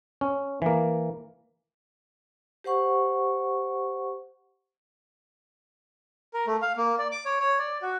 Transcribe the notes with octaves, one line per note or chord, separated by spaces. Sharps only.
C#4
E3 A#3
G4 C5 F#5 C#6
A#4
A3
F5
A#3
D5
D6
C#5
C#5
D5
F#4